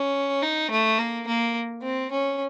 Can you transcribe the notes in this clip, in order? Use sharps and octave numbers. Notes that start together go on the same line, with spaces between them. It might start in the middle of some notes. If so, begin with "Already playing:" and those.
Already playing: C#4
D#4
A3
A#3
A#3
C4
C#4